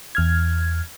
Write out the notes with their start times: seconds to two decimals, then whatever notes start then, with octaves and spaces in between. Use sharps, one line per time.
0.15 E2 F6 G#6